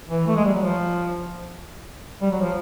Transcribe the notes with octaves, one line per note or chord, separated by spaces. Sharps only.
E3
A3
G#3
G3
F#3
F3
G3
F#3
F3